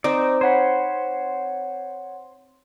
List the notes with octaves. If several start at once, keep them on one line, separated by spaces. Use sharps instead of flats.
C4 D#4 D5
C5 C#5 F#5 B5